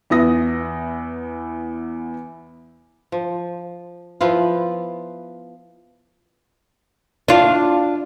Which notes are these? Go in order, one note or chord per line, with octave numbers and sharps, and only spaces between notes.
E2 B3 E4 D#6 A#6
F3
F3 B3 E4 F4
D4 F4